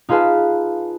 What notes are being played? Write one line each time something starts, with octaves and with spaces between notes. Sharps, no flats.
D#4 F4 G#4 B4 F5 A5